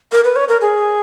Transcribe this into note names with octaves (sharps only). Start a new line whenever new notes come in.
A#4
B4
C#5
A#4
G#4